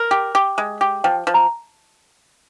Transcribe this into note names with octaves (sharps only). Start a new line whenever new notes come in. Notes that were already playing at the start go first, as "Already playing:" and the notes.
Already playing: A#4
G4
G4
G#3
G4
F3 G5
F3
A#5